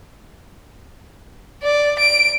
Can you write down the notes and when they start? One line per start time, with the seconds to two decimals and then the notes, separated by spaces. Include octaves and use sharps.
1.63 D5
1.99 D7